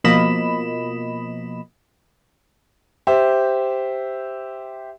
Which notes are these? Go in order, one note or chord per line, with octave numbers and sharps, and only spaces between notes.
B2 F3 A#3 D#5 B5 E7
G4 C5 E5